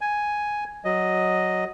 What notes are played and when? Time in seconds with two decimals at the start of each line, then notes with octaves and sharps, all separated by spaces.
0.01 G#5
0.85 F#3 D#5